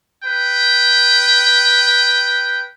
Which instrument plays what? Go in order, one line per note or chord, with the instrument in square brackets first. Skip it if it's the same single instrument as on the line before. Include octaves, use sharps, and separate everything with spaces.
[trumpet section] B4 G5